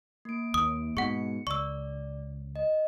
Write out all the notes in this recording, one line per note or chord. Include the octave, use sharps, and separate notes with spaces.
A#3 D7
D#2 D#6
G#2 B2 G#3 F#5 C#6 C#7
C#2 D5 C#6 E6
D#5